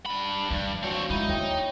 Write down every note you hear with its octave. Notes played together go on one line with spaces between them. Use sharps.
G2 B5
G2 D#3 F3
C4 D4 F#4 C#5 F5
G#3 D#4 E4 F#5
D#2 C#5 G5 D#6